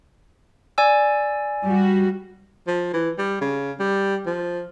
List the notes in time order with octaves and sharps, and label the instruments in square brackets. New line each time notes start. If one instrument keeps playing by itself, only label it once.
[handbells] D5 G#5 E6
[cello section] G3 F#4
[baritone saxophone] F3
E3
G3
C#3
G3
F3